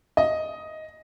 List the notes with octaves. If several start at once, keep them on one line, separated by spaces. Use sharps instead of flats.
D#5